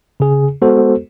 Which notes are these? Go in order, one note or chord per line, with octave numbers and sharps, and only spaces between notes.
C#3 G#4
G#3 B3 F#4 A4 C5